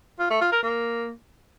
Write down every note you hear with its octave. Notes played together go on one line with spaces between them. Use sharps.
F4
A3
F4
A#4
A#3